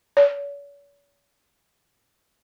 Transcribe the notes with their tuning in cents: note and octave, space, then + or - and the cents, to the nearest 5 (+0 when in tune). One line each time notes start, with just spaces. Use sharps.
C#5 +45